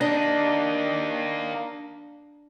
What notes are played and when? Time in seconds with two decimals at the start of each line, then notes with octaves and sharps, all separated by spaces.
0.01 A#3 D4 D#4